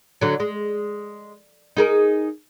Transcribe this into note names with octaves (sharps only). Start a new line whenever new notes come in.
D3 F#3
G#3
D#4 G#4 A#4